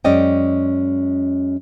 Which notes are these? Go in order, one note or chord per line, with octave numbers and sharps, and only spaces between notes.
F#2 G#3 C#4 D5 D#5 G5